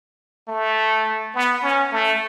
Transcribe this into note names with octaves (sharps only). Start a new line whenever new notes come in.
A3
B3
C#4
A3